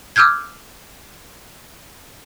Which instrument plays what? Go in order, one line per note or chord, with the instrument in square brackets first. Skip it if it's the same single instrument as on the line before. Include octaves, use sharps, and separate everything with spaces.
[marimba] D6 E6 F6 G6 G#6